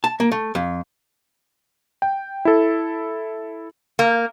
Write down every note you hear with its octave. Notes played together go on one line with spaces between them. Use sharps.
A5
A#3
A3
F2
G5
E4 A4
A#3